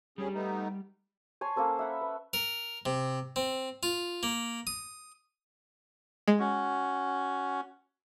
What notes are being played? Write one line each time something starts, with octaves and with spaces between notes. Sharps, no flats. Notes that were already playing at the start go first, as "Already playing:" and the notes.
D2 G3 C#4 G4 G#4
A3 B3 D#4
C#5 G#5 A5 C6
A#3 C#4 A4 C5
E5 F#5 B5
B4
A#4
C3
C4
F4
A#3
D#6
G#3
C#4 F#4